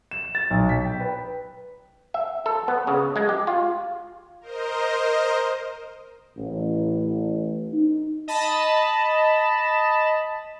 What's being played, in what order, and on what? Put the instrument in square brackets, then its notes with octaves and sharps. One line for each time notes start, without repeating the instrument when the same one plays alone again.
[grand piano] E7
A6
B1
B6
G5
B4
[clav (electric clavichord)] E5
A4
B3
C#3
G#3
G4
F4
[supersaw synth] A#4 C5 D#5
[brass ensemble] A1
D#4
[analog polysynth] D#5 A5 B5